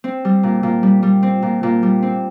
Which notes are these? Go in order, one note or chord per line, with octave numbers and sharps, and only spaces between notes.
C4
G3
A#2
A#2
G3
G3
C4
A#2
A#2
G3
C4